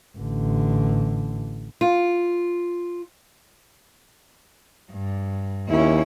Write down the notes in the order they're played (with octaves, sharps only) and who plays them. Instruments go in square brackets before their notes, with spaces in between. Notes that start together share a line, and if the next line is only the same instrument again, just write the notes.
[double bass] A1 D3
[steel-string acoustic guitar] F4
[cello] G2
[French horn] D#2 [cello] C#4 E4